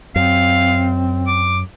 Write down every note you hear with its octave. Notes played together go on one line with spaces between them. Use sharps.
F#2 C4 F5
D6